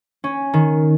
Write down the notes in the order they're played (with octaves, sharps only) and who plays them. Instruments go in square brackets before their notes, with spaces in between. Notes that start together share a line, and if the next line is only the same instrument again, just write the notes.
[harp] C#4
D#3